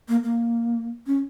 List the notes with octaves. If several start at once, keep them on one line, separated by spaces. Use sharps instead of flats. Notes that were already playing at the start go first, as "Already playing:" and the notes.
A#3
A#3
C#4